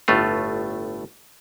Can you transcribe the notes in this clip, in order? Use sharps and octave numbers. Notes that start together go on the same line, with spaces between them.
G1 A2 A3 F4